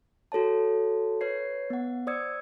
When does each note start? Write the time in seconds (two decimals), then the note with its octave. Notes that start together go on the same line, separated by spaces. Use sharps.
0.32 F#4 A4 C#5 A5
1.21 B4 C#5 G#6 C7
1.70 B3 F#5
2.07 C5 D5 D#6 E6 G#6 C#7